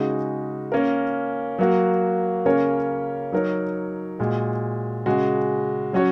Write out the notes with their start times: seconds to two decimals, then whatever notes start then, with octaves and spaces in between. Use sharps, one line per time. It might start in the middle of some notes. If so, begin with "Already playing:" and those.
Already playing: C#3 G#3 D#4 F#4
0.72 A#3 C#4 A#4
1.59 F#3 A#3 F#4
2.46 C#3 A#3 C#4 A#4 C#5
3.32 F#3 D#4 A#4 C#5
4.19 A#2 G#3 F#4
5.06 C#3 G#3 F#4
5.93 F#3 C#4 F#4 C#5